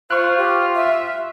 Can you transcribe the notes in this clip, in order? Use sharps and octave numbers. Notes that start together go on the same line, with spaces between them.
F4 C5 C#6 F#6
G4
E5